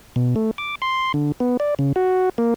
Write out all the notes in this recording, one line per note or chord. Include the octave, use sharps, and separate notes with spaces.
B2
A3
D6
C6
D3
B3
D5
C#3
F#4
A#3